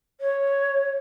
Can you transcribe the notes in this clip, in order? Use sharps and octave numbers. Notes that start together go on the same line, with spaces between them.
C#5